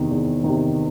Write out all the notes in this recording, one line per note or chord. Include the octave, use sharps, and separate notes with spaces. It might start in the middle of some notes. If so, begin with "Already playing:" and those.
Already playing: E2 C3 D#3
E2
C3 D#3